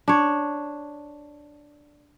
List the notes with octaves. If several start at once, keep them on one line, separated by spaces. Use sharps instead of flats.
D4 C#5